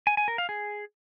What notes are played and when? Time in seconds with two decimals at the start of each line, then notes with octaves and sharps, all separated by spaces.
0.07 G#5
0.17 G#5
0.28 A#4
0.38 F5
0.49 G#4